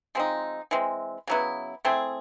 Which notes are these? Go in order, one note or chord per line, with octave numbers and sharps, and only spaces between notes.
F3 G#3 C4 D#4
E3 G#3 C4
C#3 F#3 B3 E4
A3 C4 E4 G#4